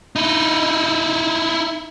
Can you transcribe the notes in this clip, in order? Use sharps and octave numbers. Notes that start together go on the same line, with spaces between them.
D#4 E4